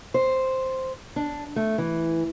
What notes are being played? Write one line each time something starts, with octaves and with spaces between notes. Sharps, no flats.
C5
D4
A3
E3